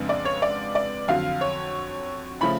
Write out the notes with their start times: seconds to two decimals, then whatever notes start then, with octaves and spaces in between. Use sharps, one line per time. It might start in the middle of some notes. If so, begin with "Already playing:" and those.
Already playing: F2 C#3 G#3 B3 D4
0.09 D5
0.25 C#5
0.42 D5
0.75 D5
1.08 F2 D3 F#3 F5
1.41 C#5
2.41 C#3 F3 A3 C#4 B5